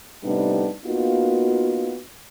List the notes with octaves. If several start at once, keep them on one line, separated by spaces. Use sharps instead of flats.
A2 C3 G3 B3 D4 D#4
A#3 B3 D#4 F4 F#4